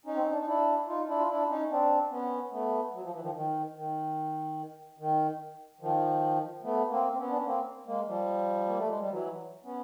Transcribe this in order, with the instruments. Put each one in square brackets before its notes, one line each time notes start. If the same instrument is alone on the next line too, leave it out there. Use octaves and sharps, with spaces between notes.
[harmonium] C#4 D#4
C4
C#4
D4
D#4
D4 E4
D#4 F4
D4 E4
F4
D4 E4
C#4 D#4
C4 D4
B3 C#4
A3 B3
F#3
F3
E3
D#3 F3
D#3
D#3
D#3
D#3 F3
A3 B3
A#3 C4
C4
B3 C#4
D4
C#4
A#3 C4
G#3 A#3
F3 G3
A#3
A3
G#3
G3
E3 F#3
B3 C#4